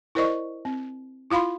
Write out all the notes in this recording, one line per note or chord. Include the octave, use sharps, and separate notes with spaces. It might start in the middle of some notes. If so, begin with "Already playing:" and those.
E4 A#4 C5 D5 D#5 C#6
C4
E4 F4 F5 B5 C6